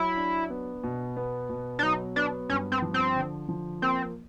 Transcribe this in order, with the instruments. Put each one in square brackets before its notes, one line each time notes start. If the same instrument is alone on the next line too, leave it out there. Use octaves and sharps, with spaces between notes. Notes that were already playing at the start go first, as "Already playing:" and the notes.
Already playing: [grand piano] F#3 [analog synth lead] E4
[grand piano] D4
B3
B2
B3
B2
[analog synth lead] D4
[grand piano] F#3 [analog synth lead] D#4
[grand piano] B3 [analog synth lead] D4
[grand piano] G2 [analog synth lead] C#4
[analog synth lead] C4
[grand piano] F3
[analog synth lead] C4
[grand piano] D3
F3
[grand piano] A#3 [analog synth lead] C4